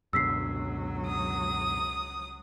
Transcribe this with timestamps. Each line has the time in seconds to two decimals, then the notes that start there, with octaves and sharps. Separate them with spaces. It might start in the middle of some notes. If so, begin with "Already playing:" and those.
0.13 C#2 F#2 B2 D3 F#3 E6 B6 C7
1.07 D#6